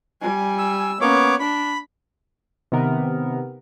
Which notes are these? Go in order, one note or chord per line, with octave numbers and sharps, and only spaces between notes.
G3 G#5
E6
A#3 B3 C#4 C#5 D6
D4 B5
C3 D#3 B3 A#4